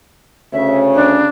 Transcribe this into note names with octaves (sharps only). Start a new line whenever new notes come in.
D2 C#3 C#4 E5
D4